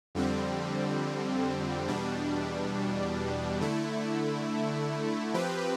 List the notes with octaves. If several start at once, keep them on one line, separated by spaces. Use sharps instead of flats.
F2 D3 G3 C4
E2 B2 G3 D4
D3 A3 E4
F3 C4 G4 B4